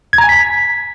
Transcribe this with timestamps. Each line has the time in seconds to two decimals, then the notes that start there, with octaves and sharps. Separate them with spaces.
0.13 G#6
0.18 A#5
0.24 G#5
0.29 B6